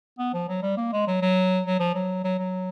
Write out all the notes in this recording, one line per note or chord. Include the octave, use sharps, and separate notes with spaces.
B3
F3
F#3
G3
A#3
G#3
F#3
F#3
F#3
F3
F#3
F#3
F#3